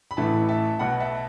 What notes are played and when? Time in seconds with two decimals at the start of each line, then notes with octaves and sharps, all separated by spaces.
0.11 B5
0.17 A1 A2 E3 A3 E5 A5
0.49 E5 A5
0.79 B1 B2 B3 F#5 B5
1.00 E5 A5